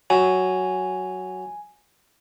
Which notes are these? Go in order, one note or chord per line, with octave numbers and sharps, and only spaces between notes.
F#3 G#5